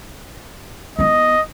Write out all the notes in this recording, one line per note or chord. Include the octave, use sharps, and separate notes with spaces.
B3 E4 D#5